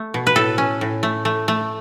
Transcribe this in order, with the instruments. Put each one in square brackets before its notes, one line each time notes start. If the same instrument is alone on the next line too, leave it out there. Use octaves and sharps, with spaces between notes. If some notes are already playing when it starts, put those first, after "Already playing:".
Already playing: [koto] A3
B2
B4
A2 A4
C#4
A2
A3
A3
A3